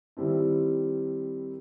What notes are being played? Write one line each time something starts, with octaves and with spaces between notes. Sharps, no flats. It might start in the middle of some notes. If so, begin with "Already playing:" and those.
D#3 G3 C4 E4